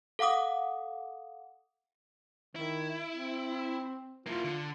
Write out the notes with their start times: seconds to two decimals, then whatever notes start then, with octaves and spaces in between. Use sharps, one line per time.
0.19 A4 F5 F#5 D6 D#6
2.56 D#3 E4
3.12 C4
4.26 A#3 E4 F4
4.44 D3